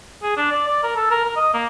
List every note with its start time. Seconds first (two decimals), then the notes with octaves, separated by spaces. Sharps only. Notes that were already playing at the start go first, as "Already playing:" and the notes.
0.23 G#4
0.37 D4
0.51 D5
0.67 D5
0.83 A#4
0.96 A4
1.11 A#4
1.24 A#4
1.36 D#5
1.54 A#3